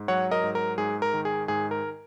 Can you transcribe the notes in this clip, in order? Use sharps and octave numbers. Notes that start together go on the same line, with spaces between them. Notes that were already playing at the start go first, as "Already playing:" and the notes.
Already playing: G#2
F#3 C#5 F#5
A#4 D#5
G#2
A#4
G#2 G#4
A#4
D#3
G#4
G#2 G#4
A#4